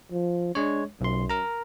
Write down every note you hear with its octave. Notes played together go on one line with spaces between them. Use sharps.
F3
G#3 D4 C#5
B1 F#2 C6
A#4 A#5